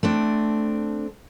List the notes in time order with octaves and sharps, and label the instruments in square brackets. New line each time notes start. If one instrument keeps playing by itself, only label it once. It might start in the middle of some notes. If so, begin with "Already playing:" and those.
[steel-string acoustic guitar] A3 C4 D4